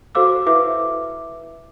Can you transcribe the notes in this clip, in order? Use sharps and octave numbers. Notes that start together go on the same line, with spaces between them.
F#4 A4 C5 F5 D6 E6
E4 B4 E5 D6